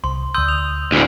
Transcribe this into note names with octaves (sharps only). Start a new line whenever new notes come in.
C2 C6
D2 C6 D#6 E6 G6
F7
D2 A2